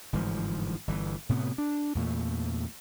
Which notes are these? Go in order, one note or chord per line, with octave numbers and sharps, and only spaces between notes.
G1 G#2 E3 F3
G1 E3
A2 C3 B3
D4
E2 A#2 A3